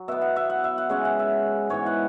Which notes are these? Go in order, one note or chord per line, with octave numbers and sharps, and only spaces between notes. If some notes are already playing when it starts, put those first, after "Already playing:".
Already playing: F#3
B2 B3 E5
F#5
E5
F#5
E5
F#5
C#3 G#3 C#4 E5
F#5
E5
G#2 E3 B3 C#5
F#5